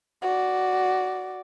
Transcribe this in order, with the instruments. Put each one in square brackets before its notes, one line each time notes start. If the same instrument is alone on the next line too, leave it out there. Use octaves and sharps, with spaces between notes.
[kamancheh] F#4 D5